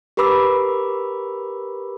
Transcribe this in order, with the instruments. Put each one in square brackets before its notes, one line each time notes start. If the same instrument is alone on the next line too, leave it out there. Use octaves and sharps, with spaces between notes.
[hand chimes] G4 A#4 B4 B5 D6 E6